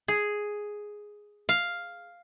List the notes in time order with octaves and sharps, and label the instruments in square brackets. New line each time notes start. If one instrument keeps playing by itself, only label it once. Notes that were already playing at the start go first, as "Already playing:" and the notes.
[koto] G#4
F5